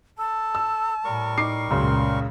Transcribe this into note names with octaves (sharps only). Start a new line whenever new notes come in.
A4 A5
E6
A2 G3 A#4 C#6
D#4 D6 C7
C#2 F#2 A#2 C#3 C6